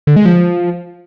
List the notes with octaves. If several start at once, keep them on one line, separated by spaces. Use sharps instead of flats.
D3
G#3
F3